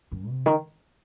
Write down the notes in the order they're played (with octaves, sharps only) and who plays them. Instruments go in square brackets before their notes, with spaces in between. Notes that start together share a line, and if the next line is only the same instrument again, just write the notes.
[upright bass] F#2
C3
D#3